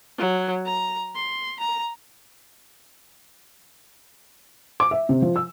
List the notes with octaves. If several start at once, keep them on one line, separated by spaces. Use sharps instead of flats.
F#3
A#5
C6
A#5
D6
E5
C3
F3
E6